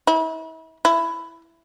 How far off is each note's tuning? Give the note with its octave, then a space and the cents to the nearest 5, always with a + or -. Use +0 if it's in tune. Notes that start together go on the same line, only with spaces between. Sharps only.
E4 -40
E4 +10